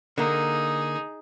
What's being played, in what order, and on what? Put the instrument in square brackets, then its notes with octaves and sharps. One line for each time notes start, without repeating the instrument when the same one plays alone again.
[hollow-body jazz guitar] D3 A#3 [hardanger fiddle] D#4 G#4